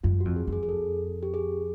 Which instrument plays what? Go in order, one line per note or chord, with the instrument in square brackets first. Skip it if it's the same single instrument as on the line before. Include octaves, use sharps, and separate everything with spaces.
[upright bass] F#2 [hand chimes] F4
[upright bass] F2 [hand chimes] F#4
[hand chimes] G#4
[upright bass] F2
[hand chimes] G#4
G#4
A4
G4
G#4